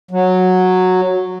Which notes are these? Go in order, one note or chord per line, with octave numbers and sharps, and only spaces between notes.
F#3